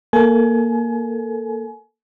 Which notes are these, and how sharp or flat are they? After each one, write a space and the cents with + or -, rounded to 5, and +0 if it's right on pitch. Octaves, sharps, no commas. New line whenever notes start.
A#3 +0 A4 +0 G#5 +30